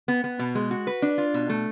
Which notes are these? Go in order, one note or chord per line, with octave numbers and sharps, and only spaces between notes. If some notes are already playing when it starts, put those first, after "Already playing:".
B3
B3
B2
G#3
F#4
B4
D4
F4
B2
A3